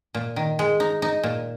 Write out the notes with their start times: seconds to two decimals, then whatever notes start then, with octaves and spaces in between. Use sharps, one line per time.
0.14 A#2
0.36 D#3
0.59 G#3
0.80 D#4
1.02 D#4
1.23 A#2